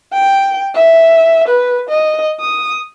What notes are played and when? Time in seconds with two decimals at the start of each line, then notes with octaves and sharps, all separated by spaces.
0.13 G5
0.75 E5
1.48 B4
1.89 D#5
2.40 D#6